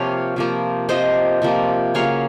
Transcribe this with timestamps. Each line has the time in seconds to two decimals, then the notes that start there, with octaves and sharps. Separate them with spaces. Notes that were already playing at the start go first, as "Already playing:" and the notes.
Already playing: C3 F3 A#3 C#5 F5
0.36 C3 F3 A#3
0.89 C3 F3 A#3 C5 D#5
1.42 C3 F3 A#3
1.94 C#3 F#3 A#3 C#5 F5